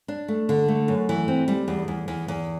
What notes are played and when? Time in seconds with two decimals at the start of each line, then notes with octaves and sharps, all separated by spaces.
0.08 D4
0.28 A3
0.49 D3
0.68 A3
0.88 F#2
1.09 E3
1.28 C4
1.48 G3
1.68 E2
1.88 E2
2.08 E2
2.28 E2